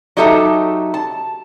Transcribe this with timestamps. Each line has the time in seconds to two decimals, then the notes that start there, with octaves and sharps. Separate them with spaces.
0.17 F#3 D#4 G4 A4 E5 A#5
0.94 A5